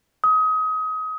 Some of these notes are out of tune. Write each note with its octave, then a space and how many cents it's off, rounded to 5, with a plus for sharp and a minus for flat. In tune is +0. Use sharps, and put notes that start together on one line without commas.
D#6 +25